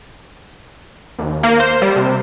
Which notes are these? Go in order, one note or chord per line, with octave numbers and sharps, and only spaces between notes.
D#2
A#3
C5
G3
C3